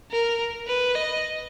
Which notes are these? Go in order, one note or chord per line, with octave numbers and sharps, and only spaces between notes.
A#4
B4
D#5